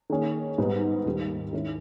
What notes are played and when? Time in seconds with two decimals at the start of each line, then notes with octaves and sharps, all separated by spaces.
0.10 D#3 A#3 C#4 G#4
0.58 G#2 G3 B3 D#4
1.05 D#2 D#3 G3
1.53 D#3 G#3 C#4 E4